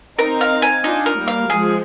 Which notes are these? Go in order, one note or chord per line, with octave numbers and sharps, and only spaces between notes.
C4 D#4 A#4
F5
G#5
D4 D#4 F4
A#4
G3 A#3
F5
F3 G#3 G#4